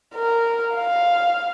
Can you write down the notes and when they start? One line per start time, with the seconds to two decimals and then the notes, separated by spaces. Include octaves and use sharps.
0.15 A#4
0.76 F5